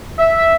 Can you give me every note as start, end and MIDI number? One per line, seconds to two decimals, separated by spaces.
0.19 0.55 76